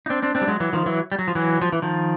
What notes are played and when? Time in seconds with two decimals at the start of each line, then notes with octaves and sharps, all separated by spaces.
0.06 D#4
0.09 C4 D4
0.22 C4 D4
0.35 C4 D4
0.41 G3
0.47 F#3 G#3
0.60 E3 F#3
0.73 D#3 F3
0.86 E3 F#3
1.12 G3
1.19 F#3
1.28 F3
1.35 E3 F#3
1.61 F3
1.72 E3
1.82 D#3 F3